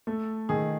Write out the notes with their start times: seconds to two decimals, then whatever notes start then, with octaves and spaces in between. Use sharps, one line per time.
0.07 A3 A4
0.49 D#3 G#4